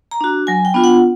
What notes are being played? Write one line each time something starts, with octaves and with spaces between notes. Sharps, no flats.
A#5
D4 F#4
F#3 G#5
G5
B3 D4 F4
F#5